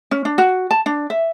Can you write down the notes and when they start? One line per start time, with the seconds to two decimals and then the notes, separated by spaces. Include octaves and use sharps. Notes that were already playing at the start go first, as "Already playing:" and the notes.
0.11 C#4
0.25 D4
0.38 F#4
0.71 A5
0.86 D4
1.10 E5